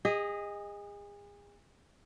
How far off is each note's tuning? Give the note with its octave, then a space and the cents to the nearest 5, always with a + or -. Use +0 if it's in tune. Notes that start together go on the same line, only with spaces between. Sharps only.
G#4 -35 D#5 +0